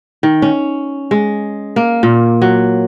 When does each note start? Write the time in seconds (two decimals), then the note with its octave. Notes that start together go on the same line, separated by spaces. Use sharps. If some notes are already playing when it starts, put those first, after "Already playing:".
0.23 D#3
0.42 C#4
1.11 G#3
1.76 A#3
2.03 A#2
2.42 F#3